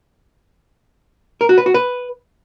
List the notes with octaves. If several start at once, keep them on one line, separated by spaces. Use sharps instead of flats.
A#4
F#4
B4
F#4
B4